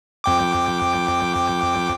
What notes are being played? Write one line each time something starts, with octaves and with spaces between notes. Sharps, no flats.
F2 G5 D6